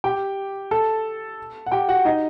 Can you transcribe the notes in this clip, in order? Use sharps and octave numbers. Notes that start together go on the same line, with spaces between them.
G4 G5
A4 A5
F#5
G4 G5
F#4 F#5
D#4 D#5